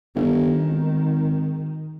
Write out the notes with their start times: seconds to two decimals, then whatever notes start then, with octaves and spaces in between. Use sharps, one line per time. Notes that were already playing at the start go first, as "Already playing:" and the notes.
0.15 G1 D#3
0.69 G#1